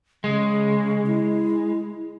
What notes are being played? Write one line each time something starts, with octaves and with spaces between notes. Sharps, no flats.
C#3 G#3
E4